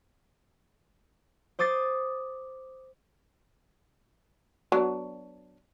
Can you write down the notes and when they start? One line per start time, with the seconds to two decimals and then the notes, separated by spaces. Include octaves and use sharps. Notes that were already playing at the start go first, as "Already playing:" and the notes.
1.59 C5 D6 D#6 A6 C7
4.72 F#3 B3 D4